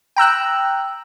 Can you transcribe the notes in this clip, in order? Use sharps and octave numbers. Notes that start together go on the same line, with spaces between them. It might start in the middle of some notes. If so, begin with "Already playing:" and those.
G5 A#5 E6 F#6